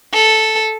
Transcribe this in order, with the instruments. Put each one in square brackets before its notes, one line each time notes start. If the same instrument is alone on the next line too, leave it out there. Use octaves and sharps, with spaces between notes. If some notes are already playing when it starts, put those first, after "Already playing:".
[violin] A4